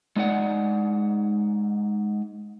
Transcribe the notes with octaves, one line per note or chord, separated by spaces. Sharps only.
G#3 D#4 D5 F#5